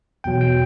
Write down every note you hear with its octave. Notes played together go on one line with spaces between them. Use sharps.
E2 B2 F#3 G5
G5